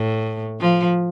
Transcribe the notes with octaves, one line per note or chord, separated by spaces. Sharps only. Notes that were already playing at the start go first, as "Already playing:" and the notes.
Already playing: A2
F3